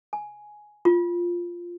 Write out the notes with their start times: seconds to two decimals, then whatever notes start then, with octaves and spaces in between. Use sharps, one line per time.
0.13 G#5
0.85 F4